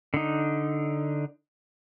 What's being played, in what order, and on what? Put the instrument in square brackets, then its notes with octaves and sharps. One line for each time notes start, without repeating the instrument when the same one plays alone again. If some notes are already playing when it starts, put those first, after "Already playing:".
[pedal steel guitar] D3 D#4